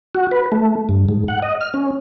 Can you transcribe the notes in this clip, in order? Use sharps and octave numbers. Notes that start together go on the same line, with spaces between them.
F#4
B4
A3
G2
G#2
F#5
D#5
F6
C#4